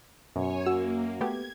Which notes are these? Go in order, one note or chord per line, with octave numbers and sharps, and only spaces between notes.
F#2 B2 C#5 G#5
A#3 F#4 E6
A3 B3 G4 G#6